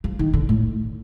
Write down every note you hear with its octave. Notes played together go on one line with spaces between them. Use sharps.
F3
D#3
D3
A2